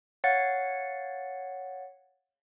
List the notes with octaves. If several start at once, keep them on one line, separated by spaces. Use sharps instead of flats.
C#5 F5 F#5 A6